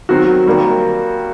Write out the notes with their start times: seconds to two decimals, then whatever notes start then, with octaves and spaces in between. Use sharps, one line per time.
0.09 D#3 F#3 C4 F#4
0.46 D#3 G3 A#3